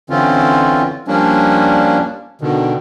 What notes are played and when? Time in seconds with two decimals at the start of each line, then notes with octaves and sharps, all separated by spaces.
0.10 D3 E3 C4 C#4 F4
1.08 F3 G3 A#3 C#4 D4
2.41 B2 D3 D#3